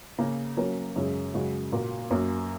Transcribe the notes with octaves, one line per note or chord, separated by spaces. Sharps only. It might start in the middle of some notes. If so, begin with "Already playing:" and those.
C#3 A#3 C#4
F#3 A#3 C#4 A#4
F#2 C#3 G#3 C#4 G#4
F#2 C#3 G#3 F#4
A#2 A#3 F#4 A#4
F#2 F#3 A#3